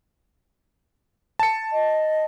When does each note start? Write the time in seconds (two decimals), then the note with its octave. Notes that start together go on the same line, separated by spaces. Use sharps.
1.39 A5 C#7
1.73 D#5